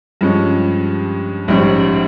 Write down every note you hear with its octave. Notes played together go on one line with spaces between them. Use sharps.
G2 F3 G#3 C#4
A#1 G#2 G3 C#4